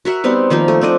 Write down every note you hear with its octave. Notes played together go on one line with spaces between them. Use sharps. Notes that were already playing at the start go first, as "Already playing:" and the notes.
F#4 A#4 E5 F#5
G3 B3 C4 D#4
D#3 F3 A#3 D#4
A3
C4 D4 D5 D#5